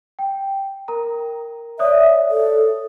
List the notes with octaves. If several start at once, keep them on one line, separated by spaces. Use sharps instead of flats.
G5
A#4 A#5
C#5 D5 E5 D#6
A4